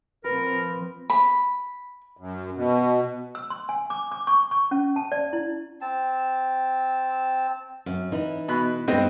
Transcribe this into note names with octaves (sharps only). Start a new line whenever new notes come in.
F3 C4 A#4 B4
B5
F#2
B2
E6
C6
G#5
D6
D6
C#6
C#6
C#4
A5
D5
E4
C4 A5
F#2
E3 D#4
B2 B5 F#6
G2 B3 C4 D#4 D#5